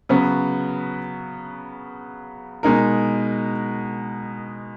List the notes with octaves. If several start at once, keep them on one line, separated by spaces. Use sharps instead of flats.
C#3 F#3 B3
B2 G#3 D#4 A#4